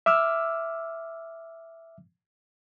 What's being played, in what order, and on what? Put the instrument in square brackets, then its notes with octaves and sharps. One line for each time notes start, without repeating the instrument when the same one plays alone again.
[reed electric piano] E5 D6 E6 F6